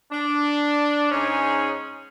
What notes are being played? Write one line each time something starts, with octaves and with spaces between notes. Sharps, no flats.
D4
G#2 C#4 D#4 G#4